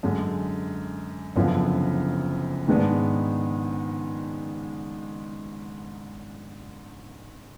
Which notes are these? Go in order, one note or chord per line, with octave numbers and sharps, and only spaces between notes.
F#2 D3 G#3
F#1 F#2 D3 F3 B3
G#2 D#3 G#3 B3 D4